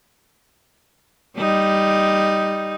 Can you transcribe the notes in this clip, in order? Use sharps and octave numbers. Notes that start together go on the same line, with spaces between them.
G3 D#4